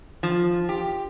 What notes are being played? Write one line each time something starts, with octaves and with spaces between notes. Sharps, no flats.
F3
G4